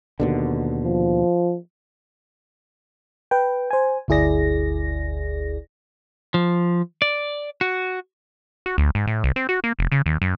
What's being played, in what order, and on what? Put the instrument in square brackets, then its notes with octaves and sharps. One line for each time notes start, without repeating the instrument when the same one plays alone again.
[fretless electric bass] D#2 B2 D3
[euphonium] F3
[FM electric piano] B4 G5
C5 G#5
G1 D2 E4 G#4 D5 A#6
[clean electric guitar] F3
D5
F#4
[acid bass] F#4
D2
G#2
A2
C2
C4
F#4
A#3
F1
C#3
D#2
F#2